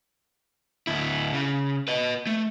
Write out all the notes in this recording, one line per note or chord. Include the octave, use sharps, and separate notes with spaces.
D2 E4
C#3
B4 D#5
A3